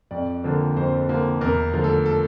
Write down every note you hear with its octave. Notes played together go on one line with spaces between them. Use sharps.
F2 D5
D3 F3 A#3
F2 C5
D3 F3 A#3
E2 A#4
D3 F3 A3
A4
A4